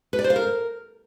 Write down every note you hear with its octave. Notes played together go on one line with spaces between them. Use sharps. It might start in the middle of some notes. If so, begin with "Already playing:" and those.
B4
D5
C5
F5
A#4